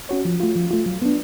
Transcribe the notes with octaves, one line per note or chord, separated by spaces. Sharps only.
C#4 F#4 C#5
F3
A3 F4
F3
A3 F4
F#3
B3 D4